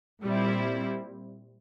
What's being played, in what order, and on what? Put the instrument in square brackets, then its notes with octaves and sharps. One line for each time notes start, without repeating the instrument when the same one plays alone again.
[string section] A#2 G3 C4 E4